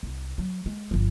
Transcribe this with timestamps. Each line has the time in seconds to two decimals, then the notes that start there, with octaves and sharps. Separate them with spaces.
0.03 C2
0.38 F#3
0.66 G#3
0.91 G1 F3